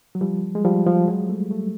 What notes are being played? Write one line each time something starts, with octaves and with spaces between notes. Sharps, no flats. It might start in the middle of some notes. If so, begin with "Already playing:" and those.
F#3
F3 G3
G#3
F3 G3
F3 G3
F#3 G#3
G3 A3
G3 A3